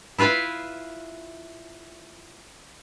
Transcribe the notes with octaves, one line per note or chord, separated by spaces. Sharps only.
E4 F4 B4 F5